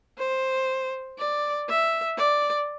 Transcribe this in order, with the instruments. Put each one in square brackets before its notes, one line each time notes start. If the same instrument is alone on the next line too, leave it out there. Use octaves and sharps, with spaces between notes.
[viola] C5
D5
E5
D5